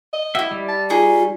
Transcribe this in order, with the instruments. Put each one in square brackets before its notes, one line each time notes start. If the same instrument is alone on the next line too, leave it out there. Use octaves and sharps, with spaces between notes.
[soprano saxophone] D#5
[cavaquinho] E4 F#4 [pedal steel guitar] E5
[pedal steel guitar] G3
[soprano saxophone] A5
[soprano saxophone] D#4 [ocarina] F4 [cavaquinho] G#4 C#6